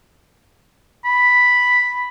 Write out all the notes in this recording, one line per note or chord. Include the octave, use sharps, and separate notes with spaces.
B5